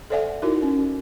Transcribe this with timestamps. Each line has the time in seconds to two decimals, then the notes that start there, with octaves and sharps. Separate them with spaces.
0.10 A4 C5 D5 E5 F#5 G#5
0.42 D#4 E4 F#4 A#4
0.62 C#4